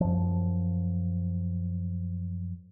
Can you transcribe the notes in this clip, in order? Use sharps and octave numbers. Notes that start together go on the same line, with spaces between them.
F#2 F3